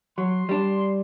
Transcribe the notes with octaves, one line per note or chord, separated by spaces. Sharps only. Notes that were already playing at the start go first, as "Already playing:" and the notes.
F#3 C6
G3 D4